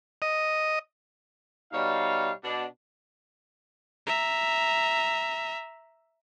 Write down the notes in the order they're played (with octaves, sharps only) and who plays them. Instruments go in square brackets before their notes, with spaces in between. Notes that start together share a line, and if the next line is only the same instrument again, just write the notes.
[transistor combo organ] D#5
[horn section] B2 G3 D#4 C#5 F5
B2 D4
[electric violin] E5 A#5